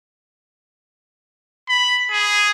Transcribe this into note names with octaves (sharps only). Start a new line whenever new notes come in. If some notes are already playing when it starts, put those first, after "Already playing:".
B5
G#4